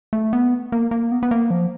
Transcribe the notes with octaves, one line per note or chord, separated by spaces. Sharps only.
A3
B3
A#3
A#3
B3
B3
A#3
F3